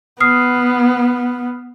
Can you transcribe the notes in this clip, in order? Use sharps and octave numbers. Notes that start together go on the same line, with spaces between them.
B3 D#6 F6 C7